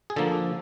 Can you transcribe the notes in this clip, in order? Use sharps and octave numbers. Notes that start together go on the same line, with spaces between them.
G#4
D3 F3 A#3 A4